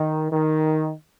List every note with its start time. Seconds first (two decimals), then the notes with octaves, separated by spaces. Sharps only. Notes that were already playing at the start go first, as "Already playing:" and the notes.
Already playing: D#3
0.32 D#3